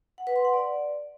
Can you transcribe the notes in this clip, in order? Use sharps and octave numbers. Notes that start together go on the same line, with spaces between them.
F#5
B4
C6
F#5
D5